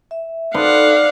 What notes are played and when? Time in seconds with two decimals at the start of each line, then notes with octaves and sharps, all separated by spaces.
0.11 E5
0.54 D4 D#4 A4 B4 C5 F5 F#5